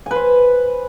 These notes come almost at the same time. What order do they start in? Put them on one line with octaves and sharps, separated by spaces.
G#5 B4 C5